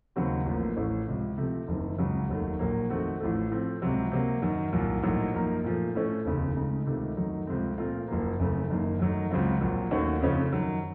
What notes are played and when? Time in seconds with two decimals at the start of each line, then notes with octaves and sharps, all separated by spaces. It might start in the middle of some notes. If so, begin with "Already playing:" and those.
0.16 D#2 C#3 F#3 C4 F#4
0.46 A1 A2 F3 A#3
0.76 A1 A2 A3 C#4
1.07 C#2 C3 F3
1.38 C3 F3 A3 C4
1.68 F#1 F#2 D#3
1.98 C#2 C#3 F#3
2.28 F1 D#2 D#3 F#3 A3
2.59 A#1 A#2 F#3 A#3
2.90 F2 D#3 A3 C4 F#4
3.21 A1 A2 F3 A3
3.51 A2 F3 A3 C4
3.82 C#2 C3 F#3 C4
4.12 C3 F#3 A#3
4.42 F#2 D#3 F#3
4.73 C2 A#2 F#3
5.03 A#1 A2 F#3 A#3 D#4
5.34 F#2 F3 A#3 D#4 A#4
5.64 A#2 F3 A3
5.95 A2 F3 A3 C#4
6.25 F1 D#2 C#3 A3
6.56 C#2 C#3 A3 D#4
6.86 C#2 C3 D#3 A3
7.17 F#2 D#3 F#3 A3 D#4
7.47 C#2 C3 F3 A3 C4
7.78 A#2 A3 C4 F4 A#4
8.08 F#1 F#2 F3 A#3
8.39 F#1 F#2 C#3 A3
8.69 F#1 F#2 D#3 A#3
8.99 F#2 D#3 F#3 A3 D#4
9.31 C#2 C#3 F#3 C4 F4
9.61 A#1 A#2 F#3
9.91 D#2 D#3 A3 C#4 F#4
10.21 F2 C#3 A3 C#4 F4
10.53 F#2 D#3 F#3